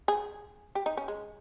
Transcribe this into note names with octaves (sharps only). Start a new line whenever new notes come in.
G#4
G4
D#4
C#4
G#3